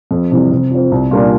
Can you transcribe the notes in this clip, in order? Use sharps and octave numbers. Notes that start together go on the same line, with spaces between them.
F2
C3 E3 G3
C3
F3 C4
C2
A#2 G3 A#3 D4